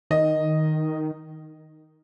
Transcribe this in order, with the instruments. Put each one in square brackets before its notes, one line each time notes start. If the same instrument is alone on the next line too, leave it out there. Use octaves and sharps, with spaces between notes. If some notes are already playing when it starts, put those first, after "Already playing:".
[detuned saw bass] D#3 [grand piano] D#5